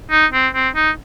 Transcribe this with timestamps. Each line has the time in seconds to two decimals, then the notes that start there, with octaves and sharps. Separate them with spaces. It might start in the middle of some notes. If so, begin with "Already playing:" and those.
0.11 D#4
0.33 C4
0.54 C4
0.75 D#4